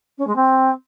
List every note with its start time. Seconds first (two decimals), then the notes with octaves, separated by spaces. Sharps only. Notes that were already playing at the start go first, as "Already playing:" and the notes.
0.18 C#4
0.27 G#3
0.36 C4